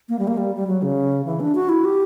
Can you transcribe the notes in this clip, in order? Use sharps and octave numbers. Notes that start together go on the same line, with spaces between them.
A#3
G3
A#3
G3
G3
F#3
C#3
E3
D4
F#4
E4
G4